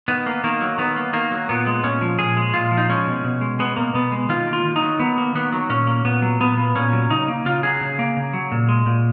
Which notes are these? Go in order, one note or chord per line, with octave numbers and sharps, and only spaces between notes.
D#3 B3
A#3
D#3 A#3
F#3
D#3 B3
A#3
D#3 A#3
F#3
A#2 B3
G#3
A#2 C#4
F3
A#2 G#4
G#3
A#2 F4
F3
D#4
G#3 C#4
B2
B2
G#3
G#3 B3
B2 A#3
B2 B3
G#3
D#3 F4
A#3
F4
D#3
D#4
F#3
D#3 B3
A#3
D#3 B3
F#3
A#2 C#4
A#3
A#2 B3
F#3
A#2 B3
A#3
A#2 C#4
F#3
C#3 D#4
A#3
C#3 F4
F#3 G#4
C#3
A#3
C#3
F#3
A#2
G#3
A#2